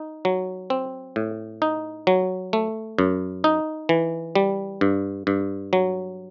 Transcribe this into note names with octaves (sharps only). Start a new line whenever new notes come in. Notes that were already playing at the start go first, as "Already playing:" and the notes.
Already playing: D#4
F#3
C4
A2
D#4
F#3
A3
F#2
D#4
E3
G3
G2
G2
F#3